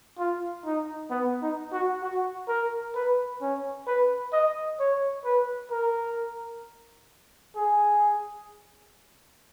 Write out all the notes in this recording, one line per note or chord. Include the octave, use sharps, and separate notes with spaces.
F4
D#4
B3
D#4
F#4
F#4
A#4
B4
C#4
B4
D#5
C#5
B4
A#4
G#4